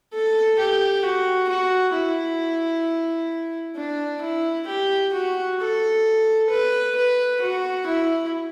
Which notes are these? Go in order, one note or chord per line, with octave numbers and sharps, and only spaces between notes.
A4
G4
F#4
F#4
E4
D4
E4
G4
F#4
A4
B4
B4
F#4
E4